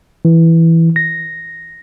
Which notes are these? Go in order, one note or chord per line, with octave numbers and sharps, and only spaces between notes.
E3
A#6